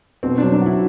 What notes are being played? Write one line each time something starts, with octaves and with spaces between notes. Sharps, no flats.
B2 C4
F#3 D4
D4
E4 F#4